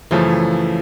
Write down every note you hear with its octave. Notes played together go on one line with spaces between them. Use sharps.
F#2 C#3 E3 F3 A3